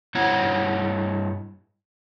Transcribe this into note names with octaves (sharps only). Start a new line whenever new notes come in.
G2 E4 C#5 F#5